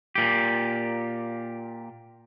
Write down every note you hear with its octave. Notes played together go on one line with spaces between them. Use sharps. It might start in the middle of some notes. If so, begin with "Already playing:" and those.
A#2 G4